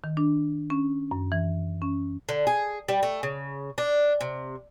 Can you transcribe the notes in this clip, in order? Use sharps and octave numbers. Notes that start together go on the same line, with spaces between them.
D#3
D4
C#4
F#2
E3
C#4
D3
G#4
G3
A3
C#3
D4
C3